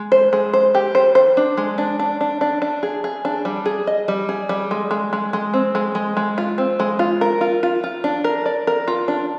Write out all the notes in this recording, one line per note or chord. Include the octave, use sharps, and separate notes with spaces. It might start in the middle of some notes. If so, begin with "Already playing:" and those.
Already playing: G#3
C5
G#3
C5
G4
C5
C5
D4
G#3
D4
D4
D4
D4
D4
G#4
G#4
D4
G3
G#4
D#5
G3
G#4
G3
G#3
G#3
G#3
G#3
C4
G#3
G#3
G#3
F4
C4
G#3
F4
A#4
F4
F4
F4
D4
A#4
D5
A#4
F4
D4